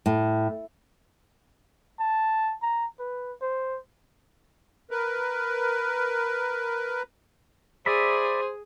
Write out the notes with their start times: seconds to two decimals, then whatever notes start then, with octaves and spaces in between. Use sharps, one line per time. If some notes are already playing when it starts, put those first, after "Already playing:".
0.06 A2
1.99 A5
2.62 A#5
2.99 B4
3.42 C5
4.91 A#4 B4
7.86 G#4 C5 D5 E5 B5